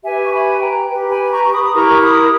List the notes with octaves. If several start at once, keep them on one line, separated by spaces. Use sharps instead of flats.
G4 B4 E5 G#5
C#6
G#5 B5
G5 A#5
G4 B4
G#5 B5
B5
A#5 C#6
C#6
B5 D#6
D#6
E4 G4 A#4 A#5 C#6
B5 D#6